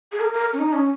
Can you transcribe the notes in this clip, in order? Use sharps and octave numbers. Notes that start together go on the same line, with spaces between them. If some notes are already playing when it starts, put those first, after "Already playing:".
G#4
A#4
A#4
C#4
D#4
C#4